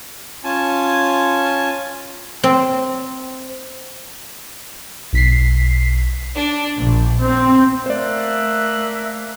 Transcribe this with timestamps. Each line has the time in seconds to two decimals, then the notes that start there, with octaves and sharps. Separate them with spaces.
0.44 C#4 F4 G#5 A5
2.44 C4
5.13 B1 B6 C7
6.35 D4
6.79 A#1
7.22 C4
7.86 A3 A#3 C5 D5 E5 F#6